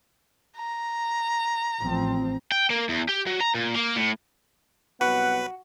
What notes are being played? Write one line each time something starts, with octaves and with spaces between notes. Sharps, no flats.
A#5
A1 F3 C4
G5
A#3
E2
G4
F#3
A#5
A#2
A#3
A2
C2 F#3 B3 F#4 B4 F#5